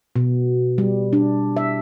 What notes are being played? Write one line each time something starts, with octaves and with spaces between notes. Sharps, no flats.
B2
G3
D4
E5